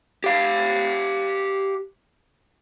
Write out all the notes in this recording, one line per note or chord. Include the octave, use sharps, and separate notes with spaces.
G4 F5